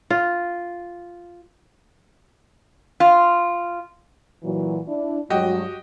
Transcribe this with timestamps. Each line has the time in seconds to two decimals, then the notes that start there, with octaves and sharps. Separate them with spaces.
0.10 F4
3.00 F4
4.43 A#2 E3 F#3
4.87 D4 E4
5.30 G2 F#3 G#3 F#4 G4 D#5